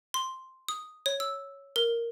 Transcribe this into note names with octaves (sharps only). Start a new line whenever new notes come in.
C6
D#6
C#5
E6
A#4